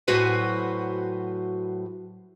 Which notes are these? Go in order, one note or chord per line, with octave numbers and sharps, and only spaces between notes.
A2 F#3 F#4 B4 C5 G#5